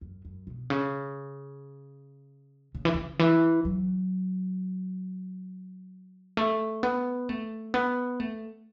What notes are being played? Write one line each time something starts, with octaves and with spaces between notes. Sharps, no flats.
F#2
F#2
B2
C#3
C#3
E3
C#3
E3
F#3
A3
B3
A3
B3
A3